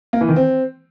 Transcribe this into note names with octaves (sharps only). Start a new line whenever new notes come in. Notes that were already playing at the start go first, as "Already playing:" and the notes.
A#3
E3
D#3
C4